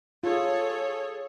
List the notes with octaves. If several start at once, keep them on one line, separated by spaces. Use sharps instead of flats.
F4 G#4 A4 C#5